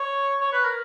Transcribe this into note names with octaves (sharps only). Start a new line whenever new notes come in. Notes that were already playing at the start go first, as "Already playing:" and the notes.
Already playing: C#5
C#5
B4
A#4